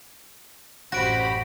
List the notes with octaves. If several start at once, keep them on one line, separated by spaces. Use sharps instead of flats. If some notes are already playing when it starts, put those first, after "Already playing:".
A1 F#2 F#4 G4 C5 B5 A#6 D7